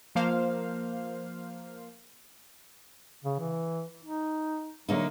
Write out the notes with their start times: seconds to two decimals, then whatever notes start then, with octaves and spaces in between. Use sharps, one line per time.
0.15 F3 A#3 C5 F5
3.24 C#3
3.39 E3
4.04 D#4
4.89 D3 F#3 A#3 D#4